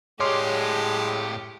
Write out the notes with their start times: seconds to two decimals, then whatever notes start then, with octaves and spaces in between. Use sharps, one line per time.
0.20 A2 G#3 G4 C#5 F5 C6 D6